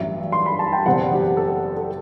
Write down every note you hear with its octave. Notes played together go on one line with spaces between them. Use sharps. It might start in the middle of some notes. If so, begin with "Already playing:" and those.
Already playing: A1 G2 F#3 E5
C6
B5
A5
G5
F#1 E2 B2 G3 C4 F#5
G4
A4
A4